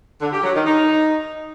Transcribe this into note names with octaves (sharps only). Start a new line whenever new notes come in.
D3
G4
F#3
D#3
D#4